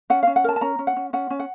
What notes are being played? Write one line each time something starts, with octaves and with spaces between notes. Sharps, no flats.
C#4 F#5
F5
C#4
F#5
A#4 A5
A5
C#4 A#5
C#4
F#5
C#4
C#4 F#5
C#4
F#5